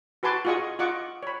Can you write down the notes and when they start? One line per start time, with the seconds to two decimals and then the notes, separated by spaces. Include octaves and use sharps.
0.23 F#4 B4 G#5 A5 C6 D6
0.45 F4 F#4 G#4 D#5 C#6 D#6
0.79 F4 D#5 F#5 C#6 D6
1.23 C#5 B5